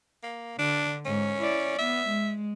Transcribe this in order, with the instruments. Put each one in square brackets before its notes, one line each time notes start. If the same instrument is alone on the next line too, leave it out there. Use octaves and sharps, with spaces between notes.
[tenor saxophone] A#3
[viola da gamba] D3 [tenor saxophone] D4
[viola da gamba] G#2 [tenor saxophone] C#4
[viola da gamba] E4 D5
[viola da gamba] B3 [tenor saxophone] E5
[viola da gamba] G#3